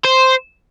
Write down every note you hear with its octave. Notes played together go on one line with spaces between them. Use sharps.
C5